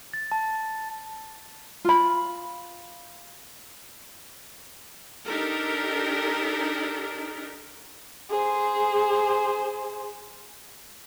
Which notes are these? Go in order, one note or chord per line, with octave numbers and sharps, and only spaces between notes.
A6
A5
F4 B5
D4 D#4 G4 A4 A#4
G#4 C5